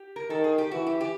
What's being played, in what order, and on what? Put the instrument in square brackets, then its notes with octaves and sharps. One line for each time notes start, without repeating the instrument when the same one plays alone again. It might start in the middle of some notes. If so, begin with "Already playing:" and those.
Already playing: [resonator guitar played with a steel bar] G4
A#4
[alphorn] D#3 [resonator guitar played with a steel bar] A4
[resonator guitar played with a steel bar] G#4
G4
[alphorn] E3 [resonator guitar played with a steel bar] F#4
[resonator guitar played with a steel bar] G4
G4